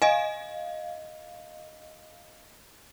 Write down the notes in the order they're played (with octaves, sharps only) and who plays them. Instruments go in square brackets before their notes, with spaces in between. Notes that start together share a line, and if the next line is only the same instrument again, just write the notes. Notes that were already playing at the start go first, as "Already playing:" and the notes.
[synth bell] D#5 F5 [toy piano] G#5